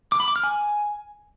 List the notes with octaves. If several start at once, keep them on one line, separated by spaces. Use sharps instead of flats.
D6
B5
D6
F6
G#5